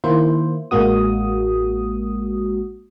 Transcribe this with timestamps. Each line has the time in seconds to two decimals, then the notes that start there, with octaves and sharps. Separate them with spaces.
0.04 D#3 A#3 E4 C5
0.71 A1 G#3 A#3 F#4 D#6